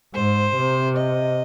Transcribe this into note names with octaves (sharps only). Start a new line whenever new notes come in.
G#2 C5
C3
D#5